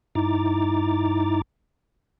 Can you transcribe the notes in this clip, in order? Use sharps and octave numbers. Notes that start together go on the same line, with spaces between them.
G2 D#4 E4 A#5 D6 A6